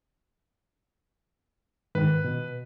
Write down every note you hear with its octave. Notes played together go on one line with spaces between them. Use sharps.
G#2 D#3 B4
B2